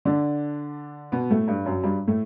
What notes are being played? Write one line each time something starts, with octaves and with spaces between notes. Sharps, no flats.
D3 D4
B2 B3
A2 A3
G2 G3
F#2 F#3
G2 G3
A2 A3